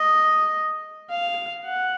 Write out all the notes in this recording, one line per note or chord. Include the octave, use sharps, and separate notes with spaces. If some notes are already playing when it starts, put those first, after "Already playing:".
Already playing: D#5
F5
F#5